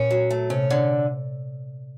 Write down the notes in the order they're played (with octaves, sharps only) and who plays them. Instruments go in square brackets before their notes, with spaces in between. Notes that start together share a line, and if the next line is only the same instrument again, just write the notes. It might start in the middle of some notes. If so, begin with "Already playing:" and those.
Already playing: [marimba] A#2 [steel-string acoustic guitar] C#4
[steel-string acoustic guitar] F#3
A3
[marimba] C3 [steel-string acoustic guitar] C#4
[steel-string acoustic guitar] D3